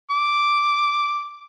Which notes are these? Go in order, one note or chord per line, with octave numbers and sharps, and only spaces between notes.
D6